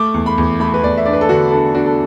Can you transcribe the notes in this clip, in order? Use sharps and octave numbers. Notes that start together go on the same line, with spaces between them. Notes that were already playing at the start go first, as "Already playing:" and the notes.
Already playing: A3 D6
E2
B5
E2
A3 B5
B4
E2 D5
E5
D4 D5
B4
A4
D3 F#4
D4 A4
D4 F#4
A4